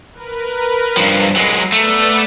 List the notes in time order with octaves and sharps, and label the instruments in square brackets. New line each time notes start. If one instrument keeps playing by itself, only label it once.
[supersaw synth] A#4 B4
[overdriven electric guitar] G2 F3
[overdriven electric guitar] F#3 G#3 [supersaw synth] A#5
[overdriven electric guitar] A3 [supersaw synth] B3 B4 D5